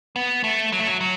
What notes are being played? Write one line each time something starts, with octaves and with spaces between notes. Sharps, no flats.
B3
A3
F#3
A3
F#3
F#3